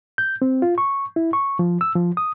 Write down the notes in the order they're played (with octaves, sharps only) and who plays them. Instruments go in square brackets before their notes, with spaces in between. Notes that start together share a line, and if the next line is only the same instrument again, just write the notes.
[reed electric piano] G6
C4
F4
C#6
E4
C#6
F3
E6
F3
D#6